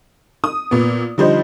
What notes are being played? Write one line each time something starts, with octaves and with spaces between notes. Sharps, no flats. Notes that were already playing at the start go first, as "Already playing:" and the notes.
D#6
A#2 B3
D3 F3 G3 D#4 C5